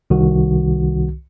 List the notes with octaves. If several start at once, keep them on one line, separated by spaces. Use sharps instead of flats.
C2 D#3 F#4